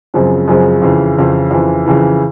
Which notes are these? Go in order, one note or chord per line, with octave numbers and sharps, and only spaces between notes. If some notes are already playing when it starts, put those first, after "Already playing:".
F#2 C#3 F3 G#3 C4
F#2 C#3 F3 G#3 C4
F2 C#3 E3
F2 C#3 E3
F2 C#3 E3
F2 C#3 E3